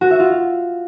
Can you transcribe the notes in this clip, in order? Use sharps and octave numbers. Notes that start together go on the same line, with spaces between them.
F#4
E5
F4